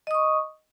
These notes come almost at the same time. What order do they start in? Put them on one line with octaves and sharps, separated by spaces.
D#5 D#6 C#6